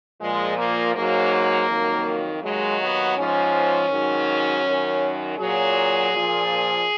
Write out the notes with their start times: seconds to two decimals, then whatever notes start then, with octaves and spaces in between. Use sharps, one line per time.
0.20 A#2 F3 G#3
0.57 A#3
0.95 G#2 F#3 A#3
1.68 F2 D#3 F#3
2.42 D#2 D#3 F#3 G#3
2.79 B3
3.16 G#2 F3 C#4
3.90 G#2 D#3 F#3
4.64 F#2 D#3 F#3
5.38 A#2 F#3 G#4
6.12 A#2 F3